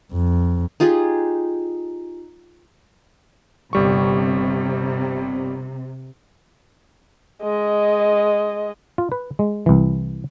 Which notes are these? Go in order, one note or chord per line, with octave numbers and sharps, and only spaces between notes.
F2
D#4 F4 G4 G#4
G1 C3 G3 C#6
G#3 D#5
F4
B4
G#3
C2 E3